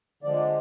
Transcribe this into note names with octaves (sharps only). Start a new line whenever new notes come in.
D3 F3 G#3 D5